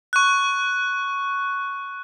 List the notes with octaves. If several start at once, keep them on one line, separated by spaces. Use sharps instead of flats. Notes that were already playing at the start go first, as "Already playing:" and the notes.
C#6 F#6